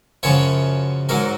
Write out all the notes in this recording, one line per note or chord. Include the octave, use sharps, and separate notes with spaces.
F#2 C#3 F3 C#5
G#2 F#3 A#4